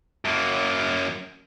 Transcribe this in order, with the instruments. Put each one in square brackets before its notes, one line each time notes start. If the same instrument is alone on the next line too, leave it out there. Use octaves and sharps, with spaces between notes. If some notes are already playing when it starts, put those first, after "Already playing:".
[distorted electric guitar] F#2 A#3